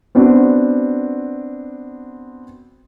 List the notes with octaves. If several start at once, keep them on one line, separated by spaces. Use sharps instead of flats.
B3 C4 D4 F#4